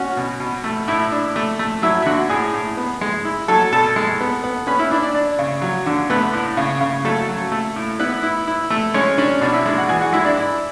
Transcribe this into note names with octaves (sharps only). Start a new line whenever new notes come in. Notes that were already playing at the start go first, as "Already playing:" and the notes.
Already playing: C#4 F#4 F#5
B2
B2
A3
A2 E4 E5
D4
A3
A3
F#3 E4 E5
E5
D3 F#4 F#5
A2 G#4 G#5
A2
B3
G#3
E4
F#3 A4 A5
B2 A4 A5
G#3
B3
B3
C#4 B4 B5
E4 E5
D4 E4 D5
D4 D5
D4 D5
C#3
F#3
D3
A3 B3 B4
A2
C#3
C#3
F#3 A3 A4
F#3
A3
A2
B3 E4 B4
E4
E4
A3
G#3 C#4 C#5
C#4 D4 D5
B2 D4 D5
E4 E5
G#3 D4 D5
F#4 F#5
E3 G#4 G#5
F#4 F#5
G#3 E4 E5
D4 D5
E4